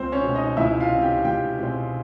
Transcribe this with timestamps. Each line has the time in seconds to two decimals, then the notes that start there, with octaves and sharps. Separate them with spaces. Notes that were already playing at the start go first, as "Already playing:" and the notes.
Already playing: C#2 C4 C5
0.12 C#4 C#5
0.23 B2 G#3 C4
0.35 D#4 D#5
0.57 C#2 E4 E5
0.80 F4 F5
0.92 B2 G#3 C4
1.02 G4 G5
1.24 C#2 G4 G5
1.58 B2 G#3 C4